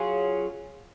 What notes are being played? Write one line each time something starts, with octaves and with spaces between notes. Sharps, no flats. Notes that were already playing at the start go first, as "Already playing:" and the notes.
Already playing: F#3 C#4 F4 G#4